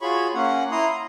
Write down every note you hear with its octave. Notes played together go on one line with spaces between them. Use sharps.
F4 F#4 G#4 C#5 B5 C#6
A#3 C#4 F#5
E4 A#5 C6 D#6
A#5